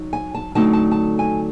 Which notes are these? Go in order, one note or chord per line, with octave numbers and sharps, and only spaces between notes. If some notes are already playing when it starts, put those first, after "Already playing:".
Already playing: F#3 D#4
G#5
A5
D3 F#3 A3 C4 D#4 A5
A5
A5
G#5